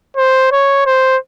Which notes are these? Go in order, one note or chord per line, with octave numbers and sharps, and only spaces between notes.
C5
C#5
C5